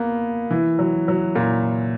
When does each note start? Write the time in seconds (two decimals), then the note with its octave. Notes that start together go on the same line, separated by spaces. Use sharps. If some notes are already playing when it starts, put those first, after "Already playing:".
Already playing: A#3 B3
0.51 E3
0.79 F#3
1.08 F#3
1.36 A#2